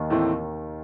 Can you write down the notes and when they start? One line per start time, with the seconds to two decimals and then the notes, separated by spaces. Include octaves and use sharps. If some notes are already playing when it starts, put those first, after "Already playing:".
Already playing: D#2 D#3
0.10 A2 E3 A3 C4 E4